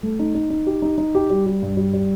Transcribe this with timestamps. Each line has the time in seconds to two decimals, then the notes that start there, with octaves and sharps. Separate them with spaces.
0.03 A3
0.19 D#4
0.34 D#4
0.50 D#4
0.67 G4
0.82 D#4
0.98 D#4
1.15 G4
1.30 G3
1.46 G3
1.62 G2
1.77 G3
1.93 G3